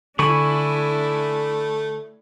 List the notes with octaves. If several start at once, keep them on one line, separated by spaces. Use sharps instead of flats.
D3 A3 D4 E4 G#5 B5 C#6